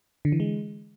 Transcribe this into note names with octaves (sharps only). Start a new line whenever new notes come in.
D3
E3
G#3